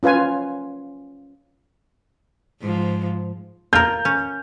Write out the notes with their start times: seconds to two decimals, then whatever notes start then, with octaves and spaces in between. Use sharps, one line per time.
0.03 C#4 F4 B4 F5 G#5
2.61 G#2 F3
3.73 F4 A#4 G6
4.05 C#4